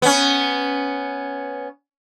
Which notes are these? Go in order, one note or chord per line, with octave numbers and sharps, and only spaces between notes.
B3 C#4